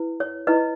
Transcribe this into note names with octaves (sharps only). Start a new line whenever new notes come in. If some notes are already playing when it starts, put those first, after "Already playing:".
Already playing: E4 B4
C#5
E4 B4 D#5